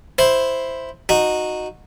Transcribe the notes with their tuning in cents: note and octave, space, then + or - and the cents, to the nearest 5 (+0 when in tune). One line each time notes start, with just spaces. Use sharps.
E4 +0 C5 +0
D#4 -10 F#4 -15